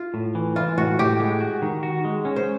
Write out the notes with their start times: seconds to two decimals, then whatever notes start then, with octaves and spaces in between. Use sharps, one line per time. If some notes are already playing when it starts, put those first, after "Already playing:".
Already playing: F4
0.14 A2
0.35 E3
0.56 E3 F4
0.78 A2 F#4
0.99 A2 G4
1.20 G#3
1.41 F#4
1.62 D#3
1.83 F#4
2.05 G#3
2.25 C#4
2.36 C5